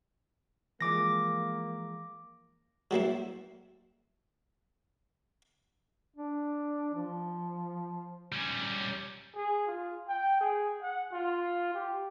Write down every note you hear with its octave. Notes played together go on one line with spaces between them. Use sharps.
E3 F3 G#3 A#3 D6 A#6
F#3 G3 A#3 E4
D4
F3
G3 C#4
G#4
F4
G5
G#4
F#5
F4
G4